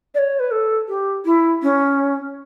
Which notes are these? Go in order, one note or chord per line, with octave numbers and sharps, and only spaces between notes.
D5
C#5
B4
A4
G4
E4
C#4